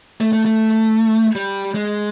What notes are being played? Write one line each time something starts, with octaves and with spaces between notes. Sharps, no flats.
A3
A3
A3
G3
G#3